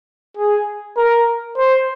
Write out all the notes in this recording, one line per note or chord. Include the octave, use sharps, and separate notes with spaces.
G#4
A#4
C5